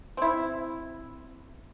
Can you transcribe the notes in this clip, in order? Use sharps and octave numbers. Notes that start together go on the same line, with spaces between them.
C4 E4